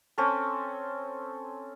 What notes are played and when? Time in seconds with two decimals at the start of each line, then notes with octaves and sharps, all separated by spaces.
0.18 C4 C#4 A4